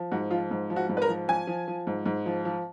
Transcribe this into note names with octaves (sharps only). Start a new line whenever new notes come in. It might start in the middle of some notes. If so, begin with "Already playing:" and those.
Already playing: F3
G#2 F#4
F3 F4
G#2
F3
F#4
G#2
B4
A#4
F3
F3 G#5
F3
F3
G#2
G#2
F3
F3